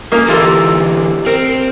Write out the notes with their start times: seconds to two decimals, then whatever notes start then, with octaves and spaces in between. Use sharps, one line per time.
0.12 A#3 C#4 D#5
0.28 D2 C3 E3 F4 G4 A4 D#5
1.26 C4 A#4